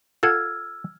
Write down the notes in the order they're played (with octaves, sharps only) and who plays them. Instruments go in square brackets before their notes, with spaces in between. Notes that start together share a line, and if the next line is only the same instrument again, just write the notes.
[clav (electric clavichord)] F4 A4 F#5 [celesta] E6 [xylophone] F6 G#6